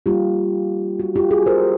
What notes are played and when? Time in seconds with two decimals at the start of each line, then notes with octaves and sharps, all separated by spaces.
0.06 G3 A#3 D#4 F4 G4
1.00 F#4
1.16 F4 G4
1.31 F#4 G#4
1.46 A#4 C5